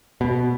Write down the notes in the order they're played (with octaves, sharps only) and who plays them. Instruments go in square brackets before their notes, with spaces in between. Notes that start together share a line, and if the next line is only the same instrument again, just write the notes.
[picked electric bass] B2